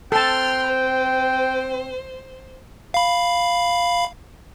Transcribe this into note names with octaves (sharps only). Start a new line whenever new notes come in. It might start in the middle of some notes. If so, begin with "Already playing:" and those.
C4 A4 G5 A5 C6 F6
C5
F5 B5